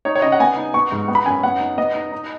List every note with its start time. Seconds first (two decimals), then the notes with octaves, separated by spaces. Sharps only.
0.05 D#4 C#5
0.16 C#5
0.22 C#3 D#5
0.32 F#5
0.40 B3 G#5
0.57 D#4
0.74 B3 C#6
0.92 G#2
1.08 B3
1.15 B5
1.25 F#2 G#5
1.43 B3 F#5
1.60 D#4
1.78 B3 D#5
1.95 D#4
2.12 D#4